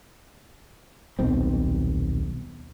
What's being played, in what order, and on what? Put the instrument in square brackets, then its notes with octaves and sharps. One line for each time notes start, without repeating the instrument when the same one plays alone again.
[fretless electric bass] D#1 B1 B2 C4